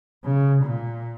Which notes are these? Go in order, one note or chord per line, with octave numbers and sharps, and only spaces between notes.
C#3
A#2